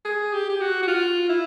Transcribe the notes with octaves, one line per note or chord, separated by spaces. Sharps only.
G#4
G4
G4
F#4
F#4
F4
E4